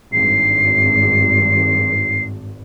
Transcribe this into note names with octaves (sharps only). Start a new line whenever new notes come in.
G#1 G2 C7